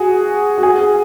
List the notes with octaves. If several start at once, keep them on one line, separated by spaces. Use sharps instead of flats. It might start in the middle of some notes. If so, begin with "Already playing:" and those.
Already playing: F#4 G#4
F#4
G#4